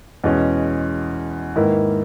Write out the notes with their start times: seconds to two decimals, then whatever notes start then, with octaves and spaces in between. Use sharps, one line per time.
0.24 E2 B2 G#3 C#4
1.56 G#2 D#3 A#3 E4 B4